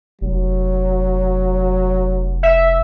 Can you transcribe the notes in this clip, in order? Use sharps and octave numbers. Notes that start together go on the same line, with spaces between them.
F1 F#3
E5